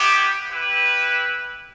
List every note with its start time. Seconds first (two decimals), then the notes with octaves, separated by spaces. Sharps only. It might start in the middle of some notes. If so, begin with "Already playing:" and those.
Already playing: B3 E4 G4
0.50 E4 G4 B4